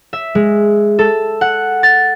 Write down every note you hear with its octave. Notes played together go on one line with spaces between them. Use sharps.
E5
G#3
A4
F#5
A6